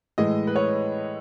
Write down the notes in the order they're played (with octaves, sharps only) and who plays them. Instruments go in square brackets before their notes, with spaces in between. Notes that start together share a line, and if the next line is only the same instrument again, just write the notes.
[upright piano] A2 E3 G#3 D#5
B4
C#5